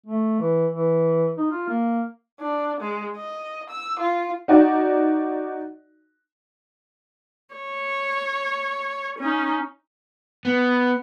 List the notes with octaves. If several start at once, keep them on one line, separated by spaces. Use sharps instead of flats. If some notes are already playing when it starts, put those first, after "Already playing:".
A3
E3
E3
D#4
F4
A#3
D4
G#3
D#5
E6
F4
D#4 F#4 D5
C#5
C#4 D#4
B3